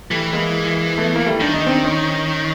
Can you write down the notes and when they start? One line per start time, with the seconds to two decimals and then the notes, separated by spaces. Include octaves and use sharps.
0.11 E3 G3 A3
0.33 G#3 A#3
0.98 A3 B3
1.16 A#3
1.26 G3 A3
1.40 D#3 D4
1.54 D#4
1.67 C4 D4
1.84 C#4 D#4